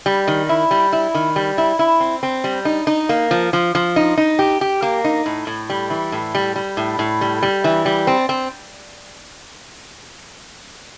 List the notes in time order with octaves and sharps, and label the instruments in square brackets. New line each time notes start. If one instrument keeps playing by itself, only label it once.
[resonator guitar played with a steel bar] G3
D#3
E4
G3
E4
D#3
G3
E4
E4
C4
C4
G3
D#4
D#4
A#3
F3
F3
F3
D#4
D#4
G4
G4
A#3
D#4
A2
A2
G3
E3
A2
G3
G3
A2
A2
G3
G3
E3
G3
C4
C4